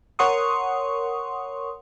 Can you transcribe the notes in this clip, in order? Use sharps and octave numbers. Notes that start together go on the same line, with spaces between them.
A#4 C#5 F#5 C6 C#6 D#6